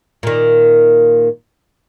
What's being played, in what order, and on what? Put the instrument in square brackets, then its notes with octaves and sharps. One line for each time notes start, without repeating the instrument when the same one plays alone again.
[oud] A#2 D#3